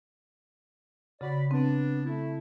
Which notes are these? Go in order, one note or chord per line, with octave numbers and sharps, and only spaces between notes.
C#3 F#4 D5 B5
B3 C4 D4
A3 E4